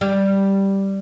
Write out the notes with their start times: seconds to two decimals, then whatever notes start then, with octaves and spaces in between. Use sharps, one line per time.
0.01 G3